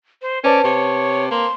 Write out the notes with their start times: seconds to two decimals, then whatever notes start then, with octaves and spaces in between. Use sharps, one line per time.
0.22 C5
0.44 C#4 B4 C5 D5 A5
0.64 C3 C#5
1.31 A#3 C6